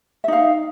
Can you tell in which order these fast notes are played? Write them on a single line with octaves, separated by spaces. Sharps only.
E5 D#4 F5